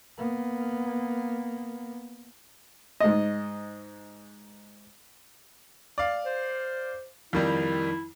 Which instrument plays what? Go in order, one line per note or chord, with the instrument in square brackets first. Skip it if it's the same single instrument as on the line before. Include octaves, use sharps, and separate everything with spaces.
[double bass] A#3 B3
[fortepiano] G#2 D#5
[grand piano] D5 F5
[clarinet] C5
[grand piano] F2 D#3 G3 [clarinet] E4